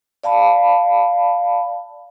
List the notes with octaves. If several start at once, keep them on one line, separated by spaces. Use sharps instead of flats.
D5 F5 A5 B5